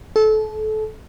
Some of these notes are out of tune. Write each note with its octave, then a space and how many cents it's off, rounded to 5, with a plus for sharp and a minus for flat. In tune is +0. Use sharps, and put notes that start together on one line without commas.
A4 -25